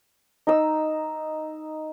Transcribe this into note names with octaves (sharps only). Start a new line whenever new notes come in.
D#4 E6